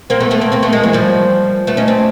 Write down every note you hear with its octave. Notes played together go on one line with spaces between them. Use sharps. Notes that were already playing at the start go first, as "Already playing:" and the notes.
A#3 C4
A3 B3
A3 B3
A#3 C4
A#3 C4
A3 B3
G#3 A#3
E3 F#3
F3 G3
A3 B3
C#4 D#4
C4 D4